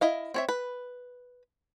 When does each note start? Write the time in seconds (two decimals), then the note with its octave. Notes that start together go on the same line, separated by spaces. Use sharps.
0.01 E4 D#5 F5
0.34 C4 C#5 E5
0.49 B4